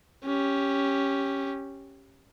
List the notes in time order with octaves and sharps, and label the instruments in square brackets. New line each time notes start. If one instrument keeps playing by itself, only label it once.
[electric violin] C#4 G4